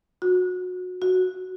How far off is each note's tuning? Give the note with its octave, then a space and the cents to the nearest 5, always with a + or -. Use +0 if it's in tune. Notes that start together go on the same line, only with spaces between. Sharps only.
F#4 -25
F#4 +0